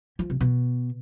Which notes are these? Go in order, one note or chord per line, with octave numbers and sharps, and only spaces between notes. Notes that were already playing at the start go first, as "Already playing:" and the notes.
F3
C3
B2